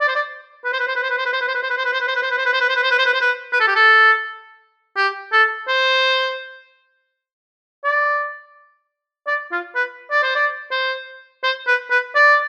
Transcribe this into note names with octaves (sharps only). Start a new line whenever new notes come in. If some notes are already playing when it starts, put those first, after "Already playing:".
D5
C5
D5
B4
C5
B4
C5
B4
C5
B4
C5
B4
C5
B4
C5
B4
C5
B4
C5
B4
C5
B4
C5
B4
C5
B4
C5
B4
C5
B4
C5
B4
C5
B4
C5
B4
C5
B4
B4
A4
G4
A4
G4
A4
C5
D5
D5
F4
B4
D5
C5
D5
C5
C5
B4
B4
D5